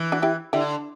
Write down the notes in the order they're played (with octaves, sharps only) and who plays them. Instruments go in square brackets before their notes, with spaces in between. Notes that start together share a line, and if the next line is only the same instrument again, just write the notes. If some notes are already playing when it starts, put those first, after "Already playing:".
Already playing: [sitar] E3
[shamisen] D4 F#4
E4 G4
[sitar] D3 [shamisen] E4 G4